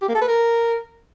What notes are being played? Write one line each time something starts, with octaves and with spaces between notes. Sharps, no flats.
G4
A#3
A4
B4
A#4